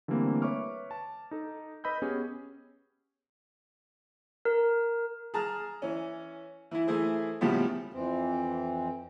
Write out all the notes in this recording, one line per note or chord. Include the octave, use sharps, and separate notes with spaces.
D3 E3 G3 A3 A#3 C4
B4 C#5 E5 C#6 D6 F6
A5
D#4 A4
B4 D#5 B5 E6 G6
B3 C#4 G4 G#4
A#4
G#4 A5 A#5 F6
E3 C#4
E3 E4
E3 A3 E4 G#4 C5
A2 C#3 F3 G3 G#3 B3
F2 E3 C4